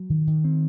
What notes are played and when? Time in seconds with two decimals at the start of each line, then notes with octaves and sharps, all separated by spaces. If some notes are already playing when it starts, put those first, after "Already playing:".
Already playing: F#3
0.10 D#3
0.27 D#3
0.44 C4